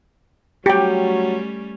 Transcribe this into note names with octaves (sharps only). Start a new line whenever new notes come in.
F#3 G3 A3 C#4 G4 G5